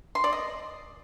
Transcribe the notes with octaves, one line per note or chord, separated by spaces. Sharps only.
C6
D5
D#5